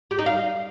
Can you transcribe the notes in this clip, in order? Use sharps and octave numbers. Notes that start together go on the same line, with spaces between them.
G4
D#4
F5